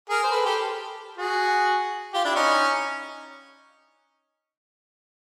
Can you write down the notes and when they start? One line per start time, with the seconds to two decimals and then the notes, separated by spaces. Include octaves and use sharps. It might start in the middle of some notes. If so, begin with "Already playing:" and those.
0.09 G#4 A#4
0.24 C5
0.31 A4 B4
0.45 G4 A4
1.17 F#4 G#4
2.13 F4 G4
2.25 D4 E4
2.35 C#4 D#4